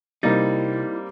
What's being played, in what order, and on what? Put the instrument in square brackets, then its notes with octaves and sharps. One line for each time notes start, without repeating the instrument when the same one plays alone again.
[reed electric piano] C3 A6 [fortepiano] G3 A#3 C4 [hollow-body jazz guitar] D#4 [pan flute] E4